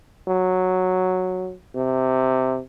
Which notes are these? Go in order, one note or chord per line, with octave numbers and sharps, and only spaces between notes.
F#3
C3